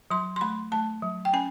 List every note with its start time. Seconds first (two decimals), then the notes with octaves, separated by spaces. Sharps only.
0.11 F#3 C6
0.36 C6
0.41 A3 B5
0.72 A3 A5
1.02 F#3
1.25 G5
1.33 C#4 G#5